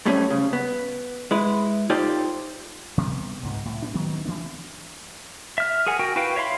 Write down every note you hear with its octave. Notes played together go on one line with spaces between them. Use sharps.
F#2 A2 G3 A3 C4 C#4
C#3
B3
G#3 E4 B4
D#4 F4 G4 A4 C5 D5
C3 G3 A#3 B3
C#2 G#2 C3
A2
B3 C#4 D4
D#3 F#3 B3 C4
D2 E3 A#3 D4
E5 F6
G#4 A#4 F#5 G#5
F#4 A#4 G5
E4 F#4 B4 F5 G5
C#5 E5 F5 B5 C6